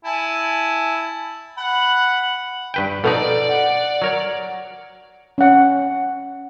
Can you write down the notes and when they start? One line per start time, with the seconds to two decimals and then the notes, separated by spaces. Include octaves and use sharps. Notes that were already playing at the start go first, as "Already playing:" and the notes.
0.05 E4 G#5 A5
1.58 F#5 B5
2.74 G2 B4 G5
3.04 B2 F3 D#4 A4 D5
3.49 F#5
4.02 F#3 A#4 C#5
5.38 C#4 F#5